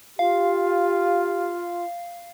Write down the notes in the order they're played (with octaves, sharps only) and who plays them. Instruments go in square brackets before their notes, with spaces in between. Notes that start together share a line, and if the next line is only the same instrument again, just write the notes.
[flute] F4 [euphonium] G4 [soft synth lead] F5